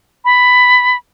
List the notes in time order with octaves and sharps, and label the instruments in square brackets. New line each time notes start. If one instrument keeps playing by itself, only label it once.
[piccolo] B5